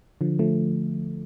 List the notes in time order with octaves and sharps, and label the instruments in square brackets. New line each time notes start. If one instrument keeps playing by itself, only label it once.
[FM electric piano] D3 F3
F3 A3